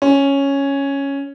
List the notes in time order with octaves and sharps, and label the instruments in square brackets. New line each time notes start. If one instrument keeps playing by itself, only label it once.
[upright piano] C#4